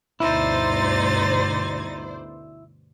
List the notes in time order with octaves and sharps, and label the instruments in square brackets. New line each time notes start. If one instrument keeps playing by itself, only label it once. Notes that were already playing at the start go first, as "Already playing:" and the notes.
[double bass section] D2 G2 B2 [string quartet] D#4 A6 [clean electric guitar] E4 [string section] C5 D5